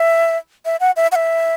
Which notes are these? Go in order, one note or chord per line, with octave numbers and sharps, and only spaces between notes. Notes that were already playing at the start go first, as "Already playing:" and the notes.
Already playing: E5
E5
F#5
E5
F#5
E5